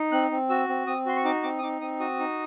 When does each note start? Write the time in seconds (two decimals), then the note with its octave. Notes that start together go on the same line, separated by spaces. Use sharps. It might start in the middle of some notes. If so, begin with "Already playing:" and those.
Already playing: D#4
0.12 C4 F#6
0.31 C4
0.50 F#4 E6
0.68 C4
0.87 C4 D#6
1.06 F#4 C6
1.16 C#6
1.25 D#4 D6
1.43 C4 D6
1.59 D#6
1.63 D#4 D6
1.81 C4 D#6
2.00 F#4 D#6
2.19 D#4